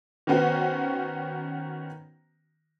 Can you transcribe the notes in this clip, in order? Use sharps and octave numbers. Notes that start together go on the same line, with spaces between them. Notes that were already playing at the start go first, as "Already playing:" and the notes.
D#3 B3 C#4 F#4 C5